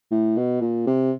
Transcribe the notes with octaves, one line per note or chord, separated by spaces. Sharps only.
A2
B2
A#2
C3